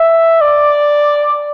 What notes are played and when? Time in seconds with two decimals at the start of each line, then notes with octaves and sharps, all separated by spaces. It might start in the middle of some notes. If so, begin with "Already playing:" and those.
Already playing: E5
0.41 D5